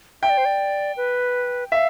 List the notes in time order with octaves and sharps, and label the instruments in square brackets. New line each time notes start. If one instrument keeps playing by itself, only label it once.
[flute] E5 [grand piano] G5
[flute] D5
C5
D5
B4
[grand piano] E5 [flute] F5